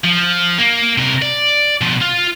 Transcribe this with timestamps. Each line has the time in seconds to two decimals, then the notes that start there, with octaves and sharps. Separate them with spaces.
0.04 F3
0.58 A#3
0.98 C3 A#4
1.22 D5
1.81 B2 F3
2.01 F4